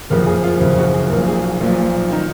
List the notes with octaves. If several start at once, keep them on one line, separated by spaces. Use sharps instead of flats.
F#1 F2 C#3 F3 A#4
G#4
F4
F#1 F2 C#3 F3
F#4
G#4
B1 A#2 F3 A#4
G#4
F#4
B1 A#2 F3 F4
D#3 D#4